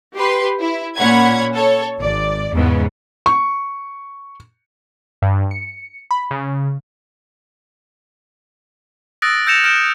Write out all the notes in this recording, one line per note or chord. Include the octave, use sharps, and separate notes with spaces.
G4 B4 C6
E4
A#2 C#4 C#5 F#5 B5 G#6
A4 C#5
G#1 D5
E2 G#2 C#3 B3
C#6
G2
C#7
B5
C#3
D#6 E6 F#6 A6 A#6 D7
E6 G6 A#6 C#7 E7 F7
F6 G6 A#6 D7 E7